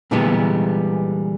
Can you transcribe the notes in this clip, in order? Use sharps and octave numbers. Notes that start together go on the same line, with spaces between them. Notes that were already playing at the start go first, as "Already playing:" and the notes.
A#2 D3 E3 G3 G#3 B3